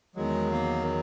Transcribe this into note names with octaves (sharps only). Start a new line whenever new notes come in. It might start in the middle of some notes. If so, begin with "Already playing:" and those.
E2 D#3 F#3 G#3
A#3